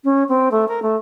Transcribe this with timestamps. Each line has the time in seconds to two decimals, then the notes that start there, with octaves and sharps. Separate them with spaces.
0.04 C#4
0.28 C4
0.51 A3
0.68 A#4
0.82 A3